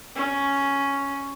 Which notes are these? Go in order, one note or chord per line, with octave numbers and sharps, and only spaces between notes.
C#4